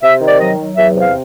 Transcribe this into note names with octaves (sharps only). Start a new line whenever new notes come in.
C3 E5
D#3
D5
F#3 D#5
F#3
E2 E5
C3
F5